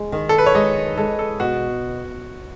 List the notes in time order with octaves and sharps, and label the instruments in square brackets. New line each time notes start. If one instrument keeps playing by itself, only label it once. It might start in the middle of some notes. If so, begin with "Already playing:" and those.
Already playing: [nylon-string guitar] G#3
D#3
[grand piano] A4
B4
C#5
[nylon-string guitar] G#3 [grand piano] D#5
[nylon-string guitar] G#3 [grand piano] A4
[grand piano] A4
[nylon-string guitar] B2 [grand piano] F#4